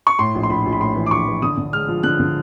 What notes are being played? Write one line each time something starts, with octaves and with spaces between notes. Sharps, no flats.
C#6
A2 C6
A#1
C6
A#1 B5
A#1
B5
A2 C6
E3
D6
A#1 C#6
E3
D3 D#6
D3
G#3 F6
F3
D3 F#6
D3